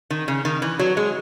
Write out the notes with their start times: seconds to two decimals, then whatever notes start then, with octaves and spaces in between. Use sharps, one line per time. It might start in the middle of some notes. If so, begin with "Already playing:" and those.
0.10 D#3
0.28 C#3
0.45 D#3
0.62 E3
0.79 F#3
0.97 G#3